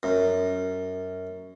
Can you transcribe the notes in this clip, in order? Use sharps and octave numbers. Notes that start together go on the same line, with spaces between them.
F#2